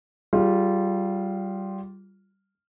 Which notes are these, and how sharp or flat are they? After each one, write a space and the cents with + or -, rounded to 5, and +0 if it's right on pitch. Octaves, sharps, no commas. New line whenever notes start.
G3 -20 F4 +0 G#4 +0